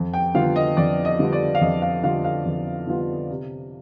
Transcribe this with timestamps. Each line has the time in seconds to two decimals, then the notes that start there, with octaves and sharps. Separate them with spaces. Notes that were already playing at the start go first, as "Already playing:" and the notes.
Already playing: F2
0.14 G5
0.34 D3 G3 B3 F4 F5
0.56 D#5
0.77 F2 D5
1.05 D#5
1.19 D3 G3 B3 F4
1.33 D5
1.55 F5
1.61 F2 D#5
1.82 F5
2.03 D3 G3 B3 F4 F5
2.24 F5
2.46 F2
2.87 D3 G3 B3 F4
3.30 C3